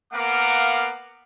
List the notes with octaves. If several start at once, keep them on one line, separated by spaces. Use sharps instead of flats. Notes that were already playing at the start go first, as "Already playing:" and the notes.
A#3 B3 A#4 F5 F#5 D6